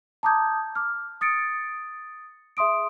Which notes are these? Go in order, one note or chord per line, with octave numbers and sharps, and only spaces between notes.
A5 A#5 D6 D#6 G6 G#6
D6 F6
D#6 A6 C#7 D7
G#4 E5 C6 D#6 D7